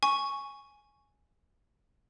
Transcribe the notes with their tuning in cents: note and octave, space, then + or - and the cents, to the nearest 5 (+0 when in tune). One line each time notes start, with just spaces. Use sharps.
G#5 +0 C#6 +0